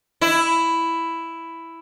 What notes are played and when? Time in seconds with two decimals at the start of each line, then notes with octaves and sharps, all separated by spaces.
0.21 E4